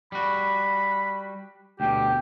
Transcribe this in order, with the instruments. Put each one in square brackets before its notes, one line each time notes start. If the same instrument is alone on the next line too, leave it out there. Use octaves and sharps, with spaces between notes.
[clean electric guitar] G3 F#4 [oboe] B5
[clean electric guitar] D2 B2 [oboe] G4 [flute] G5